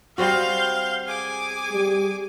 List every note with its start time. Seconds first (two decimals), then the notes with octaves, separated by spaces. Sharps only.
0.18 G3 C4 F#4 F5 C6 G6
1.07 G#4 G#5 D6
1.73 G3